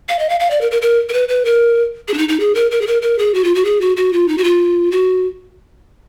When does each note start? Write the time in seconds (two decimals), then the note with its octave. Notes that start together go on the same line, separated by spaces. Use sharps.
0.09 F5
0.19 D#5
0.29 F5
0.40 F5
0.51 D5
0.61 A#4
0.71 A#4
0.82 A#4
1.09 A#4
1.13 B4
1.29 B4
1.45 A#4
2.08 G#4
2.14 D4
2.18 D#4
2.29 D#4
2.40 G#4
2.55 A#4
2.71 A#4
2.82 G#4
2.87 A#4
3.02 A#4
3.18 G#4
3.34 F#4
3.44 F4
3.55 F#4
3.65 G#4
3.81 F#4
3.97 F#4
4.13 F4
4.28 D#4
4.38 F#4
4.44 F4
4.92 F#4